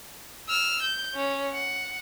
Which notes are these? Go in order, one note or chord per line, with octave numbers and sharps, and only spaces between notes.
E6 F6
G6
C#4
F#5